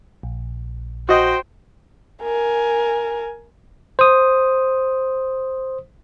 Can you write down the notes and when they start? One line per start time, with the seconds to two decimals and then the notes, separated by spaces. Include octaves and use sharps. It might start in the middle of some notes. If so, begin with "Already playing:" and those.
0.23 A#1
1.09 F#4 C5 D#5 G5
2.23 A#4 G#5
3.99 C5 D#6